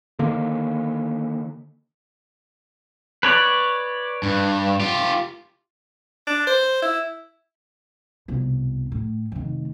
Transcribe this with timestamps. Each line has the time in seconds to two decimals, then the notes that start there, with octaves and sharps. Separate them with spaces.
0.19 D3 D#3 A#3
3.23 B4 C#5 D5
4.23 G2
4.81 F4 G4
6.27 D4
6.47 C5
6.82 E4
8.28 C2 B2
8.92 A2
9.32 F1 D#3